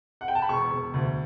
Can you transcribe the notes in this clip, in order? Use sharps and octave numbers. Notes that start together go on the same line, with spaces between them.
F#5
G5
A5
B5
E1 C#6
E1
D2